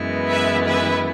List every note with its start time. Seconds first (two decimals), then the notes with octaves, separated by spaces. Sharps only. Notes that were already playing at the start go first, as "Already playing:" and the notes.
Already playing: F#2 E3 G#3 B3 E4
0.30 B4 E5
0.68 B4 E5